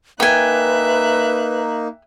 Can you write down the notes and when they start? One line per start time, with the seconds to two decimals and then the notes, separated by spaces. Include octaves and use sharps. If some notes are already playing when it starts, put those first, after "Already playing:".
0.20 A#3 D#4 B4 E5 G5 G#5 F#6